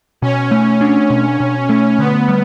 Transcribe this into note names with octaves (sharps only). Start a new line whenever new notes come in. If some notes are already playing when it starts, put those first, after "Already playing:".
B2 C#4
A3
D4
B2
B2
A3
D3 B3
G3